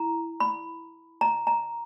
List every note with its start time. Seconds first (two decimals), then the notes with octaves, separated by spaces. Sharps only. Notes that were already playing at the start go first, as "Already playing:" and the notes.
Already playing: E4 A#5
0.40 B5
1.21 A#5
1.47 A#5